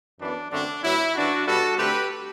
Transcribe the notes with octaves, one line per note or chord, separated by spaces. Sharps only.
F#2 E3 B3 D4
F#2 D3 A3 C4 D4
A2 F#3 B3 E4
F#2 E3 G3 D4 F#4
B2 G3 B3 F#4 A4
D3 A3 C4 G4 B4